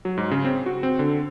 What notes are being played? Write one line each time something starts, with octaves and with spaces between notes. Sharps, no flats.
F#3
G#2
C#3
C4
F#4
C4
D3